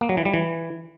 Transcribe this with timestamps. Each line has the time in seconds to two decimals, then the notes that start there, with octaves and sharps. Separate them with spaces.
0.01 A#3
0.09 F#3
0.17 E3
0.25 G3
0.34 E3